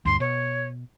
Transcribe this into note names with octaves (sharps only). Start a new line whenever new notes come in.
D2 G2 C6
B2 C#5